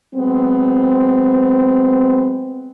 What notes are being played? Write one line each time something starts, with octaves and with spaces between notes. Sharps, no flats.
F#3 G#3 B3 C4